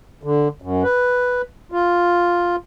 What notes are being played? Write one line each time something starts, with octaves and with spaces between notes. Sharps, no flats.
D3
F#2
B4
F4